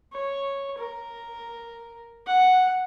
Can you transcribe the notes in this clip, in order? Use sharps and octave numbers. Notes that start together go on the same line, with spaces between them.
C#5
A#4
F#5